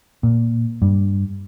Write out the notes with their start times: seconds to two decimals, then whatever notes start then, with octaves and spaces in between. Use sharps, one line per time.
0.23 A#2
0.82 G2